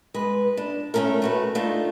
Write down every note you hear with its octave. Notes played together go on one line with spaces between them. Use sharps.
G#3 B4
D4
A3 C4 C#4 A4 A#4
A3 F#4 B4
A3 D4 D#4 F4